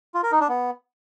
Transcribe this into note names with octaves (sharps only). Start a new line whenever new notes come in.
F4
A#4
D#4
D4
B3